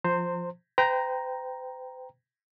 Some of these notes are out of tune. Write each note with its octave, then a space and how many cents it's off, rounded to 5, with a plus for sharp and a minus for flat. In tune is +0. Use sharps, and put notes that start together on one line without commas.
F3 +0 C5 +0 A#5 -35
C5 -45 G5 +0 A#5 +5